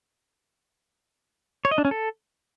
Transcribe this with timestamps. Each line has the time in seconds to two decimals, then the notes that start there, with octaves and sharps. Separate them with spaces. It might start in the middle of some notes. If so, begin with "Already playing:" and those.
1.65 C#5
1.71 D#5
1.78 D4
1.85 C#4
1.91 A4